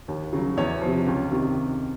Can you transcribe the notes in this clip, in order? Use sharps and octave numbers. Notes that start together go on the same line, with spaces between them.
D#2
C#3 F#3
E2 C#5
C3 F3
C#2
C3 D#3